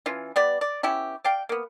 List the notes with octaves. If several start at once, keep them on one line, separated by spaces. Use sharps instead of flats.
E3 C#4 F4
G3 B3 D5
D5
B3 C#4 E4 G4
D5 F5 G5
A#3 B3